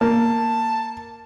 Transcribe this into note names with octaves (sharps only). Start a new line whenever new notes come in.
A#3 A5